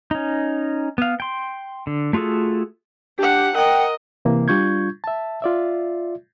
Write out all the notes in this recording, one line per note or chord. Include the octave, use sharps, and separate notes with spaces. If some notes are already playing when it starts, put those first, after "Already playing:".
C#4 D#4
B3 F5
G5 C6
D3
A3 F4 F#4 G#4 A4
D4 G4 F#5
A#4 D#5 F#5 G5
C3 E3 A#3
G3 D4 F4 C#6 G6 G#6
E5 A5
F4 D5 E5